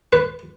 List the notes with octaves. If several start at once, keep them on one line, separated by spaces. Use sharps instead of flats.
B4